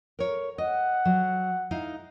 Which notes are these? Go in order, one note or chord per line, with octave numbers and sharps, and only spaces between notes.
A#4 C#5
D#5 F#5
F#3
D#4 E4 F5